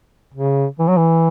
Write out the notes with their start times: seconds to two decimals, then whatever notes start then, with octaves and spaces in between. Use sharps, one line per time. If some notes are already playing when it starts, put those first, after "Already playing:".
0.34 C#3
0.79 E3
0.88 F#3
0.97 E3